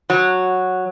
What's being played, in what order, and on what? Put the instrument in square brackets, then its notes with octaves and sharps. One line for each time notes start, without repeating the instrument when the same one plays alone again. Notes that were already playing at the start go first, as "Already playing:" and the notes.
[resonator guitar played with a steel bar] F#3